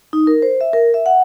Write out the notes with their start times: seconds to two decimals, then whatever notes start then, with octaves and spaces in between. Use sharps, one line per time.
0.13 D#4
0.27 A#4
0.42 C5
0.61 E5
0.73 A#4
0.94 E5
1.06 F#5